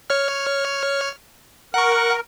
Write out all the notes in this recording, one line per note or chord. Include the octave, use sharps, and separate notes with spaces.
C#5 F6
A#4 F#5 C#6